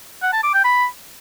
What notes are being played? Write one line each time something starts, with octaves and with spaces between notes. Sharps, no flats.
F#5
A5
D6
G5
B5